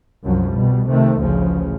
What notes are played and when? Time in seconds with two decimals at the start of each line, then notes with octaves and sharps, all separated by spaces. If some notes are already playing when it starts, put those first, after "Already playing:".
0.24 C2 F#2 F3 F#3
0.53 B2 G3
0.89 C3 D#3 A3
1.21 A1 D2 C#3 F3